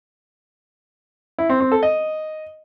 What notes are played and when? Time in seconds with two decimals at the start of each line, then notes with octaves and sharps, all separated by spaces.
1.38 E4
1.50 C4
1.61 C4
1.72 A4
1.83 D#5